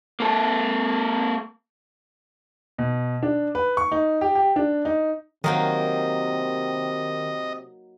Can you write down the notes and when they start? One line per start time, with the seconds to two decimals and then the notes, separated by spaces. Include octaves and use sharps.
0.20 A#3 A4
2.78 B2
3.23 D4
3.55 B4
3.77 C#6
3.92 D#4
4.21 G4
4.35 G4
4.56 D4
4.85 D#4
5.44 C3 D#3 F#3 A#3 D#4 D#5